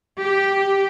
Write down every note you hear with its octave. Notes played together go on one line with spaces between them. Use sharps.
G4